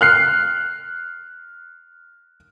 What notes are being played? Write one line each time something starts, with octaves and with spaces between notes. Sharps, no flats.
F6 F#6 C7